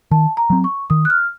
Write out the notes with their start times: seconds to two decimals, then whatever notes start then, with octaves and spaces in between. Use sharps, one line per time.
0.11 D#3 A5
0.37 A#5
0.50 F#3 C4
0.64 C#6
0.90 D#3 D#6
1.05 F#6
1.10 F6